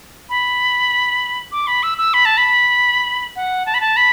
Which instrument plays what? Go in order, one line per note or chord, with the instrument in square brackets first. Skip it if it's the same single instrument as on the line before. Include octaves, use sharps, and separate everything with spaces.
[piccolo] B5
D6
B5
E6
E6
B5
A5
B5
F#5
A5
B5
A5
B5